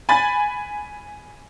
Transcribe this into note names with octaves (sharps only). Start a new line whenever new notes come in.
G#5 B5 A6